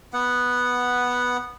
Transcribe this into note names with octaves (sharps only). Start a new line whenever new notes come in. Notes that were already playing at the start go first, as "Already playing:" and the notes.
B3 F#5